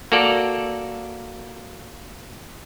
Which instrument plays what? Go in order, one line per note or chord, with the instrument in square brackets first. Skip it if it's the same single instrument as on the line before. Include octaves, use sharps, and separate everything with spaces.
[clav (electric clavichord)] A#3 F#4 A4 D5